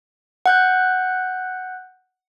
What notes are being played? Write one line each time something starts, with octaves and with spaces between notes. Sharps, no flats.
F#5 F#6 G6